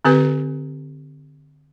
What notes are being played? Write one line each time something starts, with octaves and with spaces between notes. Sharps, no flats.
D3 C4 G4 B4